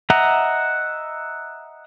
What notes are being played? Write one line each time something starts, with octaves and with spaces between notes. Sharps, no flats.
D#5 E5 F#5 A#5